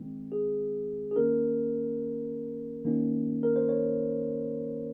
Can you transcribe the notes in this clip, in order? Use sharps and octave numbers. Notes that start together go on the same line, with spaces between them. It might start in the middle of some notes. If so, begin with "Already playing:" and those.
Already playing: D#3 G#3 C4
G#4
G#4
D#3 A#3 C#4 A#4
D#3 A#3 C#4
A#4
C5
C#5